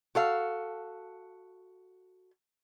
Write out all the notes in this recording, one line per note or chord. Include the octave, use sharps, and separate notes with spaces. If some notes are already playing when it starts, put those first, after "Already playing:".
F#4 A4 F5